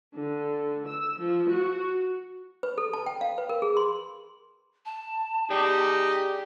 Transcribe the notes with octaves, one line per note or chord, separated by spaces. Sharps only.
D3
E6
F3
F#4
B4
A4
A5
G5
F5
B4
A#4
G#4
C6
A5
D#4 G4 G#4 D5